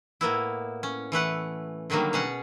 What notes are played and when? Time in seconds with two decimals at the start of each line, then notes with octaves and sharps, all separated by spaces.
0.21 A2 A#3 B3 E4
0.83 C#4
1.12 E3 A3 B4 F#5
1.90 D3 D#3 F#3 G3 A#3
2.13 B2 C#4 G#4 F#5